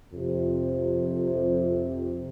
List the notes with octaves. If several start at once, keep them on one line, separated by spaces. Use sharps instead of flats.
F2 C3